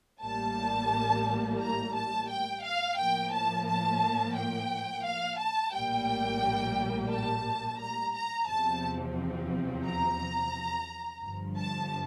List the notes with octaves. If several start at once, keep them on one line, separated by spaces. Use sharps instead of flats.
A1 A2 G3 A#3 A5
A#5
A5
G5
F5
A2 F3 A#3 G5
A5
A5
G5
F5
A5
A#1 A2 G3 A#3 G5
A5
A#5
A#5
E2 C3 F3 C4 A5
A#5
G1 G2 F3
A5